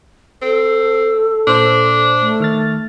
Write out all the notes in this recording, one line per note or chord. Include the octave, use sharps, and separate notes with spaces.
C4 A4
A#2 D4 C5
A3
D#3 F6 A6